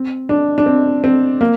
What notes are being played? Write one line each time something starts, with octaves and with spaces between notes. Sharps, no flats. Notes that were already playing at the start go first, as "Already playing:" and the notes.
Already playing: C4
D4
D4
C4
C4
A#3